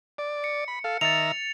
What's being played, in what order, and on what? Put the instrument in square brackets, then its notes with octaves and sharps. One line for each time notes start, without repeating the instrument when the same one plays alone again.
[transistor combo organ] D5
[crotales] C#7
[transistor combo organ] B5
A4 F5
[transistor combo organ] D#3 E5 A#5 [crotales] A6 C#7 F7